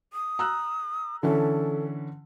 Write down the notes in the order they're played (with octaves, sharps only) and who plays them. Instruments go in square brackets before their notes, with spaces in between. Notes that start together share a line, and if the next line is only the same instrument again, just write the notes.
[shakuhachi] D#6
[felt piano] A#5 E6 F#6
[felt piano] D3 E3 C#4 [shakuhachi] A4